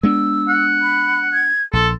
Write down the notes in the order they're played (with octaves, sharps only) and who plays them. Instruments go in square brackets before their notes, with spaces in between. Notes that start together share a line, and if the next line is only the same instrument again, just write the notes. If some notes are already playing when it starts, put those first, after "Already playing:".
[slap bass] G#3 B3 D4 [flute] E6
[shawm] F#5
[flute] B5
G#6
[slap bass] A#1 [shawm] A4 [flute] C6